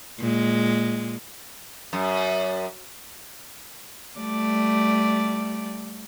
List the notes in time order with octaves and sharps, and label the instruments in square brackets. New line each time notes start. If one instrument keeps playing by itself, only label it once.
[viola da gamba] A#2 G#3
[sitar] F#2
[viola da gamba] G3 A3 D5